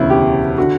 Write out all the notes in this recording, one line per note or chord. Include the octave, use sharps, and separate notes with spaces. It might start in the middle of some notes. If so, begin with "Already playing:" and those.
Already playing: E1 D2 C#3 E3 E4
G4
D3 F#4